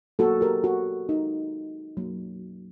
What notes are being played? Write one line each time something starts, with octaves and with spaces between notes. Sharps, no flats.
F#3 A#3 F#4 A4
G4 A#4
F#4 A4
D#4
F#3 A#3